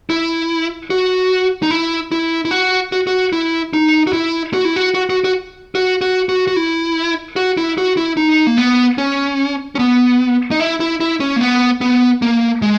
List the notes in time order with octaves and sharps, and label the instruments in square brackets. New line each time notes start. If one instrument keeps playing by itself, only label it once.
[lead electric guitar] E4
F#4
D#4
E4
E4
E4
F#4
F#4
F#4
E4
D#4
F#4
E4
F#4
E4
F#4
F#4
F#4
F#4
F#4
F#4
F#4
F#4
E4
F#4
E4
F#4
E4
D#4
A#3
B3
C#4
C#4
B3
D#4
E4
E4
E4
C#4
A#3
B3
B3
A#3
G#3